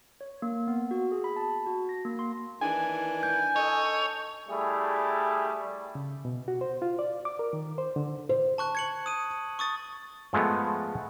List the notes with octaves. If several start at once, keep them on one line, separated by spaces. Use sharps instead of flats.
C#5
A#3
B3
F#4
G#4
B5
A5
F#4
A#6
A#3
C6
D#3 E3 D4 G#5
G6
A4 C#5 D#5
G3 A3 E4 G#4
C#3
B2
F#4
C5
F4
D5
D6
A#4
D#3
C5
D3
C5
A5 C#6 F#6
G#6 C#7 F#7
D#6 D#7
C#6 D#6 A6
F3 G#3 A3 B3